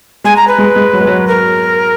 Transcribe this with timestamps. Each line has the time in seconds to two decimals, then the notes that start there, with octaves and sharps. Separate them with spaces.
0.24 G#3 G#5
0.36 A#5
0.47 B4
0.58 G#3
0.76 G#3
0.93 F#3
1.00 G#3
1.07 F#3
1.27 A#4